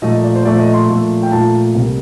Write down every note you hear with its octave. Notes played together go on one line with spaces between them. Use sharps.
A#2 F3 A3 D#5
D5
C5
A#2 F3 A3 D5
D#5
C6
A#2 F3 A3
G5
A#2 F3 A3 A5
C2 C3 G3 A#3